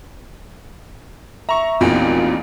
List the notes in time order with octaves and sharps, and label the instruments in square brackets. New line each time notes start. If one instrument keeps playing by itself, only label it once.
[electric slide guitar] E5 [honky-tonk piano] A#5 C#6
[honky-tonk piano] A1 E2 A#2 [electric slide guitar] C4 D#4 F#4